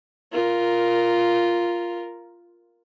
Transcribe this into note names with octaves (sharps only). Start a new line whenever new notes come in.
F4 A#4